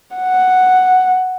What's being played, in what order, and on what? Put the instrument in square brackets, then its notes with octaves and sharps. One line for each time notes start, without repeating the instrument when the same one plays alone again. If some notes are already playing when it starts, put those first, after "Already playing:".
[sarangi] F#5